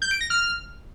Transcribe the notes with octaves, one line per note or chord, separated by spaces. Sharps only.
G6
D7
A#6
F6